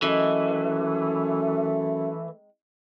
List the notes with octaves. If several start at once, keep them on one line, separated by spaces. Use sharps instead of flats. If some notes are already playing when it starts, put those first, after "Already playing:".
F#2 E3 G#3 A3 C4 D#4